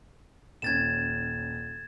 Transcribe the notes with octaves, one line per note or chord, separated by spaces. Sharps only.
D#1 C#4 G#6 A6 E7